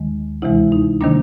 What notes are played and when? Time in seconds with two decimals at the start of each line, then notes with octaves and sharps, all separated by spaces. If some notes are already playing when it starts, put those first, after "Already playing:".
Already playing: D#2 D#3 G#3
0.42 D2 C3 E3 G#3 E4
0.72 D#4
1.01 C3 D#3 G3 A#3 D4